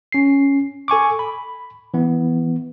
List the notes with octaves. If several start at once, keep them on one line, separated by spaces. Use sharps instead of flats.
C#4 C7
A4 G#5 C#6 D6
B5
E3 B3